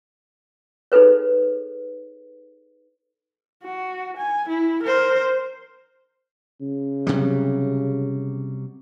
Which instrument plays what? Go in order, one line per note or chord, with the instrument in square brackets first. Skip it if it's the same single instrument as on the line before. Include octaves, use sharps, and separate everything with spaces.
[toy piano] D#4 G#4 A4 B4 C#5
[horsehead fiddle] F#4
G#5
E4
A#4 C5
[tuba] C#3
[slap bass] C3 F#3 G3